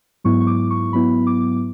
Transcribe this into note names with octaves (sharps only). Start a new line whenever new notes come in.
G#2 F#3 B3 E4 C#6
C#6
D6
C#6
G#2 F#3 B3 E4 B5
D6